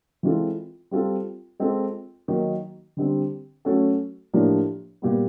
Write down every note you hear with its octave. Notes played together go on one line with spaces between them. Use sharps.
E3 G#3 C4 F4 A4
G3 C4 F4 A4
G#3 C4 F4 A4
D#3 F#3 A#3 D#4 F#4
D3 G3 C4
F#3 A3 C#4 F#4 A4
A2 F3 A#3 D4 G4
A#2 G3 B3